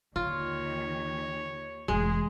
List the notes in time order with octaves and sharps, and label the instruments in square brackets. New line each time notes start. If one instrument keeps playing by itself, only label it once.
[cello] D#2 D#3 [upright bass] D3 [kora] F4 [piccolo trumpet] C#5
[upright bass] F1 A2 [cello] E3 G#4 [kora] G#3